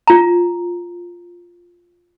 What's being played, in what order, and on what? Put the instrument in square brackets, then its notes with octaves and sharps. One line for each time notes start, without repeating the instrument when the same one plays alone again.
[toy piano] F4 A#5